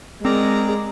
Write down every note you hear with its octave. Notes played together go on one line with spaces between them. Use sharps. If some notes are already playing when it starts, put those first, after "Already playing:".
G#3 C4 A#4 D5 A#5